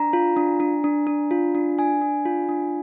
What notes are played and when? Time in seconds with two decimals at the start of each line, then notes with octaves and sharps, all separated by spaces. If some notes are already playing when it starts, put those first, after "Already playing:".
Already playing: D4 A#5
0.13 F4
0.37 D4
0.60 D4
0.84 D4
1.07 D4
1.31 F4
1.55 D4
1.78 D4 G#5
2.01 D4
2.26 F4
2.49 D4